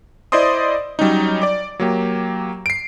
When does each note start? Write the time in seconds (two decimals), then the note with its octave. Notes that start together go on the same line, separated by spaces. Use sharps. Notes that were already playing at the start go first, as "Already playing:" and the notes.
0.32 E4 C5 D5 D#5 C6 D#6
0.99 F#3 G3 C#4 D#4
1.42 D5 D6
1.79 F#3 A#3 G4
2.66 C7 D7